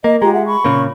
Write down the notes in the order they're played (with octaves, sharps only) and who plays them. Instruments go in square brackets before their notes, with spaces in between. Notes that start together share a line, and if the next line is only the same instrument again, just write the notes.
[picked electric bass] A#3 [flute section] D#5
[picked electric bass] G#3 [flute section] F4 G4 A#5
[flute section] E5 F#5
B5 C#6
[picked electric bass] A#2 C#3 A#3